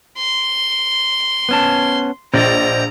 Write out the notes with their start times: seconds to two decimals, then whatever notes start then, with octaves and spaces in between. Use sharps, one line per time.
0.18 C6
1.49 B3 C#4 A5
2.34 A#1 C5 D5 D#5 A#5